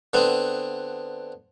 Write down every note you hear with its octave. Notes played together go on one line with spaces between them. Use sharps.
D3 B3 C4